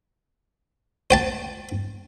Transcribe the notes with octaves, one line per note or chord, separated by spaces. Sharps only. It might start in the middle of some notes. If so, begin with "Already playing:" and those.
C5 G5 A5